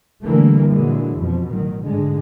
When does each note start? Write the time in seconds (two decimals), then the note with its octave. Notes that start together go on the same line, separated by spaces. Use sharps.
0.24 A#2 D3 E3 G3 A3 A#3
0.71 A#2 D3 E3 F#3 G#3
1.18 F2 B2 F3
1.49 A1 D#3 F#3
1.83 G#2 D3 G#3